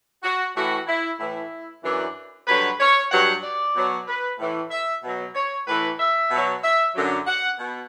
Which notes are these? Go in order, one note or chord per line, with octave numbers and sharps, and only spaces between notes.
F#4
A2 E3 F#4
E4
A2 E3 E4
F#2 E3 D4
G2 D3 F#3 B4
C#5
G2 F#3 F#5
D5
B2 F#3
B4
A2 E3
E5
B2 F#3
C#5
A2 E3 B4
E5
B2 F#3
E5
F#2 D3 F#3
F#5
B2